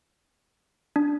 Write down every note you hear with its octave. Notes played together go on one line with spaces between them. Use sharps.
D4